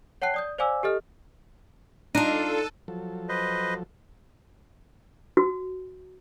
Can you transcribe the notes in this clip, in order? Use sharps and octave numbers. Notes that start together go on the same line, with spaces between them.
C#5 F#5 G5 A5 F#6 C7
D5 D#6 G6
C5 D5 F5 G#5 D6 E6
G4 A4 D#5 F6
D4 D#4 F4 A4 A5 F#6 D#7
F3 F#3 A4
B4 C5 D#5
F#4